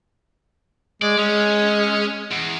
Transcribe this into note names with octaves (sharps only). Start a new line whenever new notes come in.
G#3 D5
G#3 C#4
E2